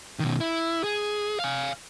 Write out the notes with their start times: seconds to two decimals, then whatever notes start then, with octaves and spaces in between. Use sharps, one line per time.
0.20 B2 D#3
0.40 E4
0.84 G#4
1.40 F5 G#5